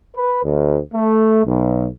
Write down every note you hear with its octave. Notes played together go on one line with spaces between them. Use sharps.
B4
D2
A3
B1